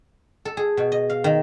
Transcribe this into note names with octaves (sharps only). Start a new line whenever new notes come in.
A4
G#4
B2
D#5
F5
D#3